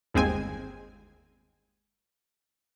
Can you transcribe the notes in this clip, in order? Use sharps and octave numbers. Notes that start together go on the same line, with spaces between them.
G1 D#2 G#3 C4 G#5